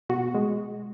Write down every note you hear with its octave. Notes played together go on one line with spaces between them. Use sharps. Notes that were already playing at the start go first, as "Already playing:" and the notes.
B2 F#4
G#3